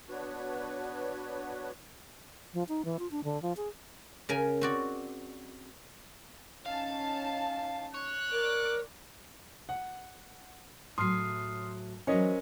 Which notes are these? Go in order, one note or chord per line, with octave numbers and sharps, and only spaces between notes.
B3 D4 F#4 B4 C#5
F3
D#4
E3
F4
D4
D3
F3
G#4
C#3 A#4 G#5
C4 F#4 D5
C#4 D#4 F5 A5
C#5 F#6
A#4 D5 D6
F#5
A2 F#3 C6 D#6 F6 C7
E3 F#3 C#4 A#4 C5 C#5 D#5